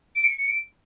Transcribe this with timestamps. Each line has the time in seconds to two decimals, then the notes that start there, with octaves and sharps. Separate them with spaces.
0.16 D7
0.24 C#7
0.37 C#7
0.48 D7